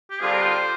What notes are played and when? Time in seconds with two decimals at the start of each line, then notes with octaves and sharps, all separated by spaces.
0.10 G4
0.21 D3 G3 C4 F4 G#4
0.32 A#4
0.42 C5